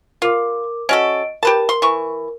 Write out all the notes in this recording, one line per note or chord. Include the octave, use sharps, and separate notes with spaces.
F4 A#4 D6
C#4 F#4 A4 D#5 D7
G4 A#4 B4 A5
C6
E3 C#6